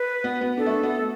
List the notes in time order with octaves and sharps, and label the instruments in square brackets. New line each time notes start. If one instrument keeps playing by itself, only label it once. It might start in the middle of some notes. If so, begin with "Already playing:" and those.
Already playing: [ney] B4
[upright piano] B3
B3
[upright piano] D4 [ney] A4
[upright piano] A3
B3